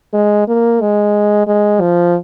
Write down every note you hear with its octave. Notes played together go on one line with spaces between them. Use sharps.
G#3
A#3
G#3
G#3
F3